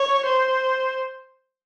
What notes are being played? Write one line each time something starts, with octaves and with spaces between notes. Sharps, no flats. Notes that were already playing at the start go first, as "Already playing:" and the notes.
Already playing: C#5
C5